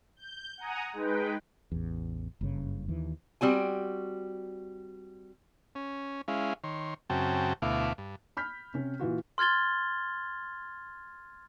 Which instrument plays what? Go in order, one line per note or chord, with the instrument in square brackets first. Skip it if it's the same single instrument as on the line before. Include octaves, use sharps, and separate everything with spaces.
[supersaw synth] G6
F#5 G#5 A#5 D#6
G#3 D#4 B4 G5
[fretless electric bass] A1 E2
F#1 G2 C#3
D#2 E3
[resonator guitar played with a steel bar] G3 C4 F#4 G#5
[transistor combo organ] C#4
G#3 C#4 E4 F5
D#3 C#5 C6
F#2 C#3 C4 F#4 G5 A5
D2 B2 A3 E4 F5 D6
G2
[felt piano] B5 F6 G6 B6
C3 C#4
A#2 E3 F4 F#4
[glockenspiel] C6 F6 G#6 A6 G7